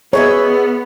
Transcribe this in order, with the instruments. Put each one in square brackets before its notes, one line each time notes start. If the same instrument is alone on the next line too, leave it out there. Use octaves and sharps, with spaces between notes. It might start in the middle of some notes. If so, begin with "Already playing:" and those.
[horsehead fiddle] B3 [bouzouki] G#4 D#5 E5 [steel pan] C#5